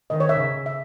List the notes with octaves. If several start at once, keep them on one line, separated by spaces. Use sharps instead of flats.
D#3 D#5
C#5
E5
C#3
E5